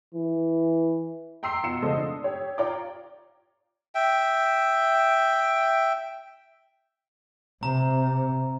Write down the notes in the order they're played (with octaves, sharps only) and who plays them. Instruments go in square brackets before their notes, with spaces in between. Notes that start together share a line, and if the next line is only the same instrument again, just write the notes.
[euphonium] E3
[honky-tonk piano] G5 A#5 C6 E6 C7
B2 F4 C#7 E7
C#3 G#3 A4 C5 D#5 D#6
D4
G4 C#5
F4 C#5 D5 G5 A#5 D6
[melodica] E5 G5
[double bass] C3 [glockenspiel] A#5